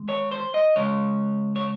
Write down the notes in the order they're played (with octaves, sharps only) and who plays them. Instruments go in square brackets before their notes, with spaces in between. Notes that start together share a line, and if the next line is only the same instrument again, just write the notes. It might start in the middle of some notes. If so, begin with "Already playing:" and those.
Already playing: [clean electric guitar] D#3 G#3
C#5
C5
D#5
C#3 G#3 C#5
C#5